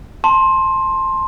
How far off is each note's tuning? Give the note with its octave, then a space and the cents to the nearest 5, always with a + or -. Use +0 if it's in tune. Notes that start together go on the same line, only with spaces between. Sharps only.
A5 +0 C6 +15